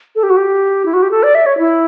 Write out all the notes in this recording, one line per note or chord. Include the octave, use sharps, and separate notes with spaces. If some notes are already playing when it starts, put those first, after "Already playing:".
A4
G4
F#4
G4
E4
F#4
G4
A4
D5
E5
C#5
E4